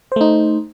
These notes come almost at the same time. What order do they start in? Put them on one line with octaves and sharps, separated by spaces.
C5 A3 D#4